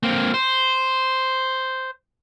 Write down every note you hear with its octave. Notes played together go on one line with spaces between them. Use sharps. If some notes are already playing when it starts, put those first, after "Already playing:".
A#3 C4
C5